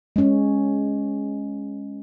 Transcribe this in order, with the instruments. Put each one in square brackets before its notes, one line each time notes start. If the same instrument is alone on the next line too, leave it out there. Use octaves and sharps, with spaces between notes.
[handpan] G#3 C#4